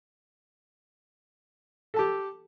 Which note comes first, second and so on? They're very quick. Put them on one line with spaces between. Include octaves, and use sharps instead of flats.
A4 A5 G4